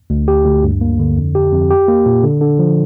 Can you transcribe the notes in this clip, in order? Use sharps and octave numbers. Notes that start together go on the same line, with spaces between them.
D2
G4
D2
G2
A#3
D3
F2
G4
F2
G4
A#3
A#2
D3
D3
F3